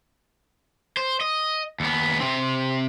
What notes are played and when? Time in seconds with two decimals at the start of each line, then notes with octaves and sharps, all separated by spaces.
0.97 C5
1.21 D#5
1.80 D#2 B3
2.20 C3 C4